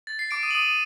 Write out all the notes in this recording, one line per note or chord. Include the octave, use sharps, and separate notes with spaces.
A6
C7
D6 D7
D#6 D#7
F#7
D#6 D#7